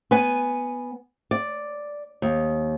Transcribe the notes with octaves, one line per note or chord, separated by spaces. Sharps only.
B3 B4 G#5
D5
D#2